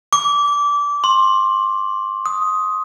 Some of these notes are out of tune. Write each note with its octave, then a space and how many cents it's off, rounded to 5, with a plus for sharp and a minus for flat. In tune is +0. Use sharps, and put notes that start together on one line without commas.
D6 -20
C6 +20
D#6 +10